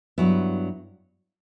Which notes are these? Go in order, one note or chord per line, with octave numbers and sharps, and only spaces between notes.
G2 F#3 B3 E4